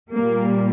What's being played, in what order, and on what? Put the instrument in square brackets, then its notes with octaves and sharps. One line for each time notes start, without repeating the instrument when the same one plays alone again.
[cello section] A#2 G3 A#3